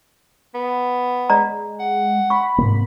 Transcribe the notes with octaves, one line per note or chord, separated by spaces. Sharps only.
B3
G#3 D5 D#5 A#5
F#5
B5 C#6
G#2 C3 A#3